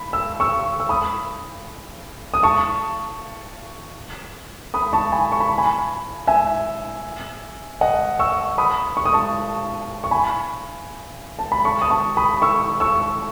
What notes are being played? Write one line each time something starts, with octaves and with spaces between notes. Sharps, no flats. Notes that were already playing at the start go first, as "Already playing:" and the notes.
Already playing: B5
E6
C#6 E6
E6
B5 D#6
D#6
A5 C#6
B5 D#6
A5 C#6
G#5 B5
C#6
B5
A5
G#5 B5
E5 G#5
D#5 F#5
C#6 E6
B5 D#6
C#6
D#6
A5 C#6
C#6
G#5 B5
A5
B5
A5 C#6
D#6
A5 C#6
B5 D#6
C#6 E6
C#6 E6